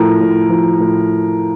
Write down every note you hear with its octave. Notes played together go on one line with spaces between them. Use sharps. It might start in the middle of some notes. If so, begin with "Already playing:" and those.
Already playing: A2 F3 A#4
A2
F3
A2